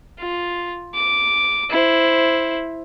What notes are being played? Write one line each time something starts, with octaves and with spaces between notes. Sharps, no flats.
F4
D6
E4 C5